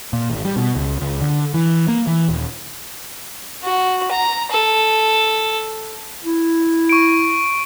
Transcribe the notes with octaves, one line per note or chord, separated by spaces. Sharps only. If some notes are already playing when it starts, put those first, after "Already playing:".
A#2
G#1
G3
B2
C#2
C#2
D3
E3
A#3
E3
D#1
F#4
A#5
A4
E4
C#6 D7